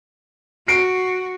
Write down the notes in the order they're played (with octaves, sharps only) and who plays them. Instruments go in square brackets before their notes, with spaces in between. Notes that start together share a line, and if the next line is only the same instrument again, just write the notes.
[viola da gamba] F#4 [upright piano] C7 D7